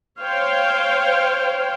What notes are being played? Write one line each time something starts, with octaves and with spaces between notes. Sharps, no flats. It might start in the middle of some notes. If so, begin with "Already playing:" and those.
C5 C#5 F5 G5